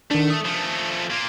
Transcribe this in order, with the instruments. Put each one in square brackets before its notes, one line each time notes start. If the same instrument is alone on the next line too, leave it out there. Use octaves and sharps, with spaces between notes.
[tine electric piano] D#3 D4 [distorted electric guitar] A3
[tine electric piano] D#6
[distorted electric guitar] F3 A3
A#3 F4